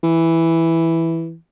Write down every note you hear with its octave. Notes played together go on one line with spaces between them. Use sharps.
E3